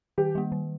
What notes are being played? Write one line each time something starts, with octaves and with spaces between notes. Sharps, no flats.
D#3 G4
G3 A#3
D#3